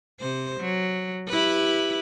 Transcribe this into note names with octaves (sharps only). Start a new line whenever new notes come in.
C3 C5
F#3
E4 G4 B4